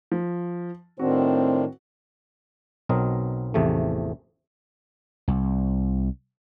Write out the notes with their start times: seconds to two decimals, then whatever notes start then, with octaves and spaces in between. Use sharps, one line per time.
0.12 F3
0.99 A2 D#3 C4 D4 F#4
2.89 B1 B2 F#3 C4 A#4 D#5
3.54 A1 E2 C3 F3 A3
5.28 C2